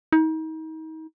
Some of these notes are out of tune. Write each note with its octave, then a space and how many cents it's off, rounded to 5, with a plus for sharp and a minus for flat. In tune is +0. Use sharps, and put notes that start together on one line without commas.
D#4 +35